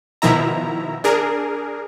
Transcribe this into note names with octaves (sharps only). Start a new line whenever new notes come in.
B2 D#3 F3 E4 E5 A#5
D4 G#4 A#4